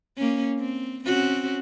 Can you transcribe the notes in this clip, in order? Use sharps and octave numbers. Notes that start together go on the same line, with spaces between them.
A#3 C#4
C4
C4 C#4 F#4